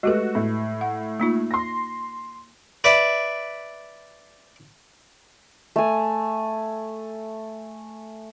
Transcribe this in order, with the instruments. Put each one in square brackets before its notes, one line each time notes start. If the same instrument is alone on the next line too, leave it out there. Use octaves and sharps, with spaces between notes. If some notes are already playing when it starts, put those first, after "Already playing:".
[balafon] G#3 G4 B4 [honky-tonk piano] A3 F#4
[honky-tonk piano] A2
[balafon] F#5
A#3 D#4 F4
[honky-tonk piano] C6 A#6
[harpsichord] B4 D5 E5
[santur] A3 G#5